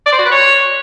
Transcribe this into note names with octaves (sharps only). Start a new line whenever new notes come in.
D5
C5
F#4
B4
C#5